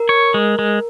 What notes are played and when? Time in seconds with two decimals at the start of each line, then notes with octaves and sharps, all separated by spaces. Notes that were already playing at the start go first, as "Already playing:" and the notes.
Already playing: A#4
0.09 C#5
0.34 G#3
0.59 G#3